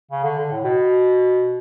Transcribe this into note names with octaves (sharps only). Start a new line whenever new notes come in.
C#3
D3
D3
A2
B2